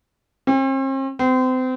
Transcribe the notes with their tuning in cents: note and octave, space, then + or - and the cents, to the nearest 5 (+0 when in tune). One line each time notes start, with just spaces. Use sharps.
C4 +45
C4 -30